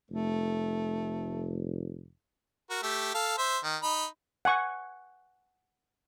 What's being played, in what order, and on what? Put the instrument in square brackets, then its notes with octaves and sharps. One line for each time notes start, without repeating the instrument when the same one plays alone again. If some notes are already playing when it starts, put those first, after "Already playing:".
[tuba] F1 [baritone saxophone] A3
[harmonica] F#4 A#4
A3 G4
A4 F5
C5 E5
D#3
D#4 B5
[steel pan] F#5 G#5 C#6